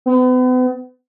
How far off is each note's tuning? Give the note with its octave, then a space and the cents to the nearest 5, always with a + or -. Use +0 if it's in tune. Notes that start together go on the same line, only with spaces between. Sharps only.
B3 +40